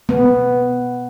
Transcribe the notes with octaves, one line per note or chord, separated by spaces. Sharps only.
B3